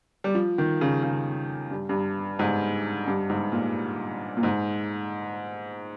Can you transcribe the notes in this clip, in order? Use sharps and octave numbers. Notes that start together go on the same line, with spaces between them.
G3
F3
D#3
C#3
C#3
G2
G2
G#2
G2
G#2
A#2
A#2
G#2